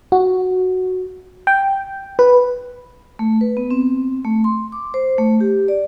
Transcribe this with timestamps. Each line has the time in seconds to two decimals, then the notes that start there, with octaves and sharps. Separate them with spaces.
0.12 F#4
1.47 G5
2.19 B4
3.19 A3
3.41 B4
3.57 B3
3.71 C4
4.24 A3
4.44 C6
4.72 D6
4.94 C5
5.18 A3
5.41 G4
5.68 D5